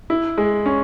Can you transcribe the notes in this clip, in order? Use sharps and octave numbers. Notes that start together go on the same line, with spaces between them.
E4
G#3
C#4